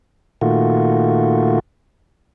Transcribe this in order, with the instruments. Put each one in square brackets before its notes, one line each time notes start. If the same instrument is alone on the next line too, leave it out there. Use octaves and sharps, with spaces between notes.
[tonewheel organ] A#2 D#3 A3 F4 F#4